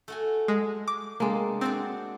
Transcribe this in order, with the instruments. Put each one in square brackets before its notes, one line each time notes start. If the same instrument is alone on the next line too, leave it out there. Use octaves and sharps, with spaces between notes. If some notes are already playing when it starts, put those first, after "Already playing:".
[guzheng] A3 F#4 G#5
[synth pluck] G#3
D6
[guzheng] C3 D4 [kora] G#3 A#3
[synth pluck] C4 [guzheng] D4 F#4 D5